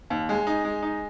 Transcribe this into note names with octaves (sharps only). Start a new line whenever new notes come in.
D#2
G#3
D#4
G#3
D#4